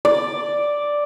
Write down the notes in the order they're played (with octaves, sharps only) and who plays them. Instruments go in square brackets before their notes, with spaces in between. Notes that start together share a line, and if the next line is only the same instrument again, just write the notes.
[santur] D5